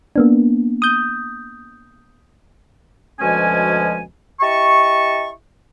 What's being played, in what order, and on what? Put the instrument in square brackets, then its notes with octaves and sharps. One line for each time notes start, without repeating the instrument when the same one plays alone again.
[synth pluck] A#3 B3 D4
D#6 G6
[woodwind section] D2 B2 F3 G#3 C#4 G#5
E4 G4 D#5 A5 C#6